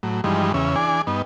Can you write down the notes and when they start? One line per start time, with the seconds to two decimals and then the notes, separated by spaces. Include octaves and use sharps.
0.03 A2 F#3
0.24 G2 E3 F3 G3 G#3 D#4
0.54 E2 C#3 C#4 E5
0.76 E3 D4 G#4 G#5 D6
1.07 G2 B3 D#4